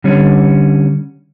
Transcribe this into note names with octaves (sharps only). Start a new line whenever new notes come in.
D3 G3 C#4